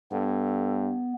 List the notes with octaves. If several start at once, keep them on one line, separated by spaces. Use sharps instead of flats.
G2 B3 A4